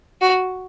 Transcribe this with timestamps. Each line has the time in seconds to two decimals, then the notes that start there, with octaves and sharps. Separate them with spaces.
0.21 F#4